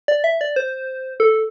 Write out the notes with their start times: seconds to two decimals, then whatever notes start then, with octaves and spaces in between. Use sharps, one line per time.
0.08 D5
0.24 E5
0.41 D5
0.56 C5
1.20 A4